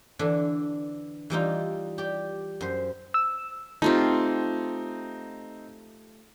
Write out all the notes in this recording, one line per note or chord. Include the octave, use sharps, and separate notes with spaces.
D3 E3 D4
E3 G3 D#4 F4
G4 D5
F#2 C5
E6
A3 C4 D#4 F4 G4